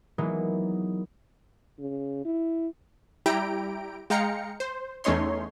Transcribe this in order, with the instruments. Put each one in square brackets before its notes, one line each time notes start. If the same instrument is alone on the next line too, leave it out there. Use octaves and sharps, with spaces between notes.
[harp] E3 F#3 G#3 A#3 B3 D#4
[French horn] C#3
E4
[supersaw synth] G3 E4 G4 G5 A#5 D7
G#3 F5 G5 A#5 C#7
C5
E2 A3 C#4 D#4 C#5 C6